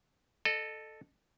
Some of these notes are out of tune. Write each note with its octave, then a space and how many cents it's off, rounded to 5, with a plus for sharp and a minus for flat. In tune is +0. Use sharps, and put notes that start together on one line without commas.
A4 +0 D#5 -35